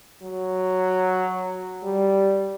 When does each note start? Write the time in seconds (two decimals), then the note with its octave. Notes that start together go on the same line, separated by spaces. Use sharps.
0.22 F#3
1.83 G3